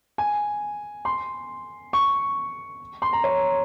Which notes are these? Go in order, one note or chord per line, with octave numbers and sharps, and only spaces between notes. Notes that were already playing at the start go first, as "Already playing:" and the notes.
G#5
C6
C#6
C6
A#5
C#5